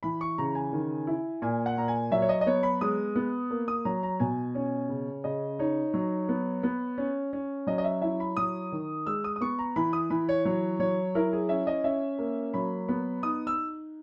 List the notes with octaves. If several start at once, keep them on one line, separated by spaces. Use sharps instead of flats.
E3 B5
C#6
C#3 A#5
G#5
D#3
E4
A#2 G#5
F#5
A#2 A#5
G#5
F#3 E5
C#5
D#5
D#5
B3 C#5
B5
G#3 D#6
B3
A#3
D#6
F#3 A#5
A#5
B2 G#5
C#4
C#3
C#3 D#5
D#4 C#5
F#3
B3
B3
C#4
C#4
F#3 D#5
D#5
E5
E4 E5
B5
F#3 D#6
D#3
G#3 E6
D#6
D#6
B3 C#6
A#5
E3 B5
D#6
E3 B5
C#5
F#3 C#5
F#3 C#5
E4 A#4
G#4
C#4 E5
D#5
C#4 E5
A#3
F#3 B5
B3 B5
D#4 D#6
E6